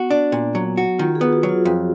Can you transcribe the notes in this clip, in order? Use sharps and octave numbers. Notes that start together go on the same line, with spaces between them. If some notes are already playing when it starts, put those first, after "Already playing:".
Already playing: B3 F#4
D4
A#2
F#3
F#4
D#3 F4
G#4
B3
F#4
F#3
F4
F2